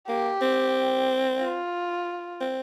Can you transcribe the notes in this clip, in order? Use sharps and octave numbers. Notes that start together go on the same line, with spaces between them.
A#3 G4
C4
F4
C4